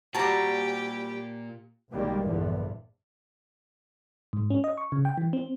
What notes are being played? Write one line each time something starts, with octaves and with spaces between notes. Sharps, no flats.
A#2 G3 C4 F#4 G4 A5 A#5
B1 D#3 G3 G#3 A#3
A#1 E2 G2 D3 F3
G#2
C#4
D#5
C#6
C#3
G5
E3
C4